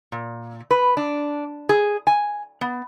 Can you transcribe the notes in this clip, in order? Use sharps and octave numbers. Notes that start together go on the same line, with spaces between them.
A#2
B4
D4
G#4
G#5
B3